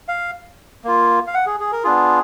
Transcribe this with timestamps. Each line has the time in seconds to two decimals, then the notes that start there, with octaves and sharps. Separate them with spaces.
0.08 F5
0.84 A#3 F4
1.27 F5
1.34 F#5
1.46 G#4
1.60 G#4
1.72 A#4
1.84 B3 D4 F4 G#4